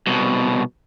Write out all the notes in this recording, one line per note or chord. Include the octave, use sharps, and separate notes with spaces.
C2 B2